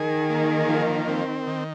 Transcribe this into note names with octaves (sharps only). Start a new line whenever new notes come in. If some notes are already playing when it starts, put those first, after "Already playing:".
Already playing: D#3 G#4
A#3
F3
C4
D#3